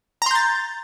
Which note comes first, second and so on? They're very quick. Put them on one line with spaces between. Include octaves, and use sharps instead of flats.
A#5 C6 G6 A6